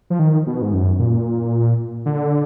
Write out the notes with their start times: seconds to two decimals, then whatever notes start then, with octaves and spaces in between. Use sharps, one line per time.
0.10 F3
0.19 D#3
0.47 B2
0.62 G#2
0.73 F#2
0.99 A#2
2.06 D3